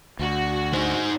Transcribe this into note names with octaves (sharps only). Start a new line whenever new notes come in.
D2 F#4
D#4 C5